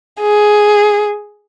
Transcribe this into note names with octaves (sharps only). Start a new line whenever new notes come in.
G#4